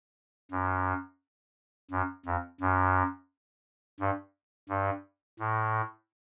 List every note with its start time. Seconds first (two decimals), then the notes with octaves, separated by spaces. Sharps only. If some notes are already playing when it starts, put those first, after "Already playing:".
0.51 F#2
1.91 F#2
2.26 F2
2.61 F#2
4.00 G2
4.69 G2
5.39 A2